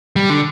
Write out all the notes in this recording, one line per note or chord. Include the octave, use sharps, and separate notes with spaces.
G3
D3